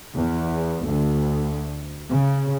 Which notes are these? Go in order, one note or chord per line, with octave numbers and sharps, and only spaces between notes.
E2
D2
C#3